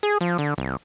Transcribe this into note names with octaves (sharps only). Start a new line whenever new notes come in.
G#4
F3
D3
C2